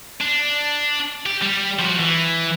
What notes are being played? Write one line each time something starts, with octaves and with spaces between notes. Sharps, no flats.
D4
G4
G3
F3 F#4
E3